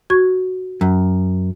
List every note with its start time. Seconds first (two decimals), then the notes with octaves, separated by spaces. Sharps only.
0.10 F#4 C#6 G#6
0.81 F#2